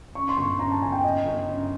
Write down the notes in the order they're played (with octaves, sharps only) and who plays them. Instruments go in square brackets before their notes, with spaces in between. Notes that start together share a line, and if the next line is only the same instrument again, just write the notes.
[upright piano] C#3 [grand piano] C#6
[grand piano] C6
[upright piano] G1 [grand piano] C#6
[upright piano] F#2 [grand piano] A#5
[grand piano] A5
[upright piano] G1 [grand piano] G#5
[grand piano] G5
[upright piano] C#3 [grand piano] D#5
[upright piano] G1
F#2